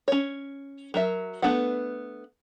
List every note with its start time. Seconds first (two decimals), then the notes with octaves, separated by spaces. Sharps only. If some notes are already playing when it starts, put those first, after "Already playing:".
0.08 C#4 C#5
0.94 F#3 A#4 E5
1.42 A3 B3 D4 B4 F#5